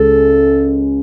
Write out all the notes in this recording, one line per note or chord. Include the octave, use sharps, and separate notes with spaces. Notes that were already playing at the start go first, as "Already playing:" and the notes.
Already playing: C#2 C#3 G#3 A4